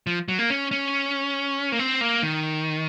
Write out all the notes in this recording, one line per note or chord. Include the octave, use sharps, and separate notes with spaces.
F3
F#3
A#3
C#4
C#4
A#3
C4
A#3
D#3